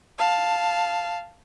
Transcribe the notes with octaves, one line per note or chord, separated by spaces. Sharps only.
F5 A5